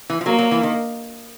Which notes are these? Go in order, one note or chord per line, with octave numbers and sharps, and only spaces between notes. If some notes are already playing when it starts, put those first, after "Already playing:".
E3
F3
F#3 A#3
F#3
E3
D#3